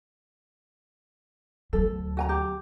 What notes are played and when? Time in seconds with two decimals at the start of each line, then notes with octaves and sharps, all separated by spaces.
1.73 D2 F#3 A4
2.17 F#4 G#5 A#5
2.29 G4